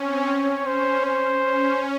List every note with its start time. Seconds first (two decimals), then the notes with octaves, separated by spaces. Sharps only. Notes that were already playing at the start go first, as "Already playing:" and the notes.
Already playing: C4 C#4 C#5
0.65 C#4 C5
1.05 C5
1.44 C#4